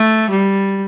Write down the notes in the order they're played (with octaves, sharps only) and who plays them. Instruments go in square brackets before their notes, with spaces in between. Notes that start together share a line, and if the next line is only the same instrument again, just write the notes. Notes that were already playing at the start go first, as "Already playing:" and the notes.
Already playing: [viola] A3
G3